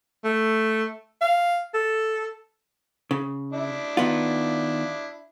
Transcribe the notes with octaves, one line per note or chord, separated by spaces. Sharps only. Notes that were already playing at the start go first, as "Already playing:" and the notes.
A3
F5
A4
C#3
D4 E4
D#3 B3 F4